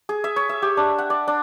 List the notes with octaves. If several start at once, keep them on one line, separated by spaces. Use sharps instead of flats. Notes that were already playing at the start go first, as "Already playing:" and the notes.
G#4
E5
C#5
E5
G4
D4
F#5
D5
D4